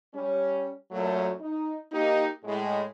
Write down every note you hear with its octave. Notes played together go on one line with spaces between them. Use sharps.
G3 C#4
F#2 A#2 F#3 A3
D#4
A#3 D#4 G4
A2 G#3